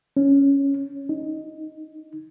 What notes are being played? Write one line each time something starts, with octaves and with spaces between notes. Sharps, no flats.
C#4
D#4